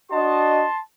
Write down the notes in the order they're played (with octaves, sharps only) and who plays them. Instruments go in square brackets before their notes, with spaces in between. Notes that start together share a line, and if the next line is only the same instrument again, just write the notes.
[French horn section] D4 F#4 D#5 [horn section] A5 C6